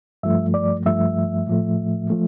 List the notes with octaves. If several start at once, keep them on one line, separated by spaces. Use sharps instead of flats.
G2 F3 A3 E5
D5
G2 F3 A3 E5
A2 F3 A3
F3 A3